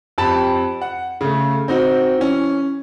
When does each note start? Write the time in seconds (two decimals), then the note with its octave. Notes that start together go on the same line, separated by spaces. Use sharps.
0.18 F2 G4 A5 B5 A6 E7
0.82 F#5
1.21 C#3 A3
1.68 C4 D#4 F#4
2.19 E3 C#4